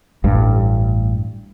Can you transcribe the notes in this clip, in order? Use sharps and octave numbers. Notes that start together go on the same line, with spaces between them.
A1 G2